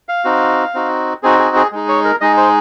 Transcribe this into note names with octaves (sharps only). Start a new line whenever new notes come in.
F5
C4 D#4 F#4
C4 D#4 F#4
C4 D#4 F#4 G#4
G#4
G#4
G#3 D#4 G#4
C#5
A#4
G#3 D#4 G#4 D#5
C5